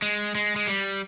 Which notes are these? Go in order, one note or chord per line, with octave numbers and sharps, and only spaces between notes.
G#3
G#3
G#3
G3